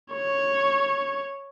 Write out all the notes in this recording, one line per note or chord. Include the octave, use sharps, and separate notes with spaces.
C#5